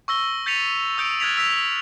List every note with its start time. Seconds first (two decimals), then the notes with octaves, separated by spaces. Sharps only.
0.08 C#6 E6 A#6 G7
0.46 G6 A6 B6 C#7 D#7 F7
0.97 D#6 E6 G6 C#7 D7
1.20 F6 F#6 G#6 A6 B6 F7
1.37 E6 B6 F7